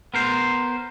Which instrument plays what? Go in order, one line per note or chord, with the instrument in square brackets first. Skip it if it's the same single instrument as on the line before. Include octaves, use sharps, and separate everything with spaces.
[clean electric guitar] B3 A#4 C5